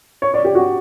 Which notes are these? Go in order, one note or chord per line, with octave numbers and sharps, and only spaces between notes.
C#5
D5
G4
F#4